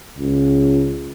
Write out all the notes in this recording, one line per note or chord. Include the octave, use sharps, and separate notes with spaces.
C#2